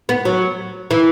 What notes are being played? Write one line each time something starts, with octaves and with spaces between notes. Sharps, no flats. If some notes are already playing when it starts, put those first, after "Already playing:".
B3
F#3
E3